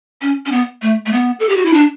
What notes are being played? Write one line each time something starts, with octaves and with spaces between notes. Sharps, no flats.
C#4
C#4
B3
A3
A3
B3
A4
G4
F#4
E4
D4